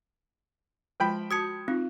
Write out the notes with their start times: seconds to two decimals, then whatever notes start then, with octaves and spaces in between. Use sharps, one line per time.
1.00 F3 G#3 G5 B5
1.31 F#4 A5 D#6 G#6 C#7
1.68 C4 D#4 F4